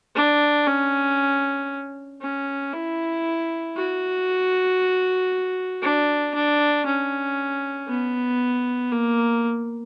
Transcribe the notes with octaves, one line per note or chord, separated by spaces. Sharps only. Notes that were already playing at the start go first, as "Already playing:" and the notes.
D4
C#4
C#4
E4
F#4
D4
D4
C#4
B3
A#3